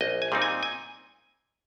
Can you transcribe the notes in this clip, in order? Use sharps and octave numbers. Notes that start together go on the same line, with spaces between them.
A#1 D#5
G#5
A#2 G3 C4 D#4
G#5
G#5